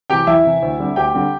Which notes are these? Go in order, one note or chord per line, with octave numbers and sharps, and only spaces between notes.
C3 E3 G4 G5
E2 E4 E5
C3 E3
D2
D3 G3 C4
D2 G4 G5
D3 G3 C4